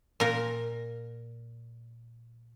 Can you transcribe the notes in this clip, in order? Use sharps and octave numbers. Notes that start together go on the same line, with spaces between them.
A#2 A#4